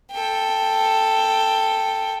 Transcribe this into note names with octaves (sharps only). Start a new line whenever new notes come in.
A4 G5